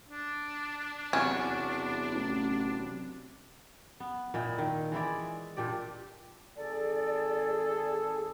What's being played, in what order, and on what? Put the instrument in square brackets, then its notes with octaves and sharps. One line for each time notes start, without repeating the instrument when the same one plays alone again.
[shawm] D4
[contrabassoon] E2 [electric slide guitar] C3 F#3 B3 [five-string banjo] C#4
[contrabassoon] A1
[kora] B3
A#2 E4 D#5 G5
D#3
E3 G#3 E4 D5
A#2 D4 G4 D5
[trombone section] G#1 G#4 A4 [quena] D5